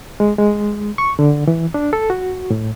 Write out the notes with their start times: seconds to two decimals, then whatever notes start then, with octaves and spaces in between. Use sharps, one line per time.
0.20 G#3
0.38 G#3
0.98 C#6
1.19 D3
1.47 E3
1.74 D4
1.93 A4
2.10 F#4
2.50 A2